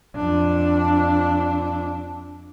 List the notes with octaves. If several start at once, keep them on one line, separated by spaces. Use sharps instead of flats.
F2 D4